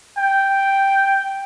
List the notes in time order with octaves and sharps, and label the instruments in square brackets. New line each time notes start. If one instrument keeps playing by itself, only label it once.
[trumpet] G5